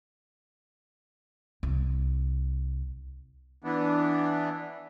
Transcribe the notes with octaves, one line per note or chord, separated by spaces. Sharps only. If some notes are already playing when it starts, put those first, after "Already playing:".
C2
E3 B3 D4